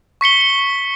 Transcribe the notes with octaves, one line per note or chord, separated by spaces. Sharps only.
C#6 B6 C#7 G7
G7